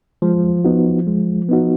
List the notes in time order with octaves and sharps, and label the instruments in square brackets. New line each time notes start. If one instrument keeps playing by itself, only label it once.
[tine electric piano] F3 [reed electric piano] G#3
[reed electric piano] B3 D#4 F#4
G#3
B3 D#4 F#4